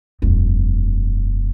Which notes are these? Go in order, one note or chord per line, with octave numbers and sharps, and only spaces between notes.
E1 F#2